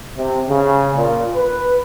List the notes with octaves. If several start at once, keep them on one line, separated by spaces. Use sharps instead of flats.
C3
C#3
A#2
B4